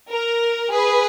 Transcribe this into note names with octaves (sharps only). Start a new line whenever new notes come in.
A#4
G#4 B4